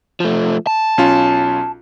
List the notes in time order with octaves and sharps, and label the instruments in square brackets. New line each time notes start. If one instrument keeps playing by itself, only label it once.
[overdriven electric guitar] F3 A3
A5
[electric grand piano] B1 C#4 F4